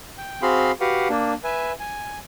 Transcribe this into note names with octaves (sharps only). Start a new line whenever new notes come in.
G5
C4 F#4 G#4 F5 B5 C6
F#4 G4 B4 F5 F#5
A#3 D4
B4 E5 G#5
G#5